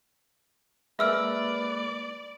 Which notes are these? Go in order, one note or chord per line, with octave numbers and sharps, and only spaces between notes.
G#3 A#3 B4 D5 E5 E6 F6